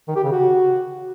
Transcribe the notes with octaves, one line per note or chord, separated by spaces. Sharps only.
D#3
G4
C#3
F#4